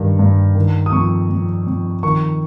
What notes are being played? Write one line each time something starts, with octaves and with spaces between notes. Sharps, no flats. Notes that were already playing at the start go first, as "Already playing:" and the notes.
Already playing: G2 D#3
G2
D#3
D#6
F2 C#6
F2
F2
D#3 C#6